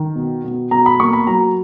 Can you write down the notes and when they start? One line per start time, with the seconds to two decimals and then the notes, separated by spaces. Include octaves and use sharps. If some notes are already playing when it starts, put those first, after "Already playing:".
Already playing: D#3
0.15 B2
0.44 B2
0.71 B2 A#5
0.86 B5
1.00 A#3 C#6
1.13 B5
1.27 F#3 A#5